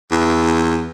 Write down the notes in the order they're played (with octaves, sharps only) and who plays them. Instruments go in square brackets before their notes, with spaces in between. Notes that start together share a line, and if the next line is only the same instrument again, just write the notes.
[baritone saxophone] E2